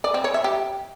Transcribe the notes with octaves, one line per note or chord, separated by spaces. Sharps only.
D5
C4
C#5
E5
G4